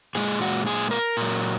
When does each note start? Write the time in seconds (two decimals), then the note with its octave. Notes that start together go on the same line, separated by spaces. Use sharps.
0.15 A#2 G#3 G#4
0.41 F#4
0.67 G#4
0.91 A#4
1.17 A#2 F#3